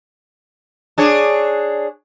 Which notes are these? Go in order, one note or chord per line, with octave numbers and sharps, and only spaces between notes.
D4 G#4 C#5